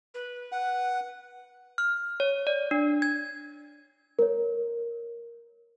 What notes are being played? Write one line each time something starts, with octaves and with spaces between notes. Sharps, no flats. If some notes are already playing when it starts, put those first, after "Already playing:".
B4
F#5
F6
C#5
D5
D4
G#6
A#4 C#5